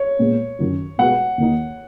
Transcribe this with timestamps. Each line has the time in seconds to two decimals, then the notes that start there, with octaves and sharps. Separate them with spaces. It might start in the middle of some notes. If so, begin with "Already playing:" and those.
Already playing: C#5
0.19 A#2 G#3 B3
0.59 F#2 D#3 F#3
0.98 B2 G#3 B3 F#4 B4 F#5
1.37 D#2 D#3 A#3 D#4